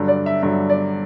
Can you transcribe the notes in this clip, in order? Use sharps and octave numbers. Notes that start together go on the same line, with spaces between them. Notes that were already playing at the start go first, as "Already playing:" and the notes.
Already playing: G2 D3 F#3
D5
E5
G2 D3 F#3 E5
D5